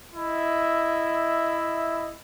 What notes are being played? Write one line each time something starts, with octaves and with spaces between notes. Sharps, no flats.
E4 D#5 E5